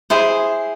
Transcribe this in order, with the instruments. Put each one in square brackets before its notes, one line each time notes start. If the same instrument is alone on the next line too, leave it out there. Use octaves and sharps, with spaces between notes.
[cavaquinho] E4 G#4 C5